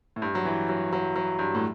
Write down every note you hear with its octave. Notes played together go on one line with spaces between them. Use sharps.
A2
G2
F#3
E3
F#3
F#3
F#3
G2
A2